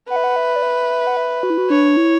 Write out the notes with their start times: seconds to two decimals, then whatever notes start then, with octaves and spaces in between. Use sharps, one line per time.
0.09 B4 F#5
0.16 E5
0.24 F#5
0.36 E5
0.56 D5
0.63 E5
1.07 F#5
1.17 E5
1.43 F#4
1.50 E4
1.58 F#4
1.70 D4 C#5
1.97 E4